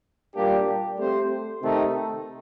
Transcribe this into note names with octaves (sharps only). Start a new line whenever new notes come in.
A#2 G3 A#3 D4 G4
A3 C4 G4 C5
C3 D#3 A3 D#4